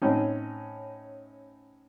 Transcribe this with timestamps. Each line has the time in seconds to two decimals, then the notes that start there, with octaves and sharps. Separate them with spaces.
0.02 A2 C4 C#4 D#4